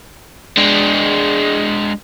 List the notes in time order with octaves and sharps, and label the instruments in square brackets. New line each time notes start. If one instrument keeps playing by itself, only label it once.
[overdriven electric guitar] G#3 D4